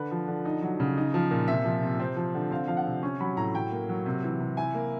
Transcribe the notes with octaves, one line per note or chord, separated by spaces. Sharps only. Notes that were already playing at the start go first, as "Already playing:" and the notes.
Already playing: D3 B4
F3
D3
D#4
F#3
C#3
D#4
F3
A#2
C3 E5
F3
C3
C4
F3
D3
C4 F5
F3 F5
F#5
C3
C#4
F#3 B5
A2 A#5
F#3 G5
A#3
F#3
C3
E3
C3
E4 G#5
A#3